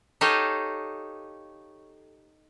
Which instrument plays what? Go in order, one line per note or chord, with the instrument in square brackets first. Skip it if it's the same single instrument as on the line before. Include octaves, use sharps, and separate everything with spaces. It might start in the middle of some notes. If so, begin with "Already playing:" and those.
[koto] D#4 G4 A4 C#5 D#5 F5